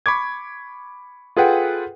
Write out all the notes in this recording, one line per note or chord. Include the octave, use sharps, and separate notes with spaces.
B5 C#6 D6 G#6
F4 G#4 A4 B4 F#5 G5